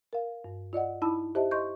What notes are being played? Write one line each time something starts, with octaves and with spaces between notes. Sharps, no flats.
A#4 F5
G2
F4 D5 D#5 F#5
D#4 E4 A5 B5 E6
G4 C5 D#5 E5 A5
D#5 C6 C#6 G6